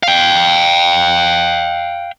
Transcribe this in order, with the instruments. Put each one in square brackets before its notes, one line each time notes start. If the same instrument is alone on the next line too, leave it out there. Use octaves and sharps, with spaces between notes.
[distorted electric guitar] F5 G5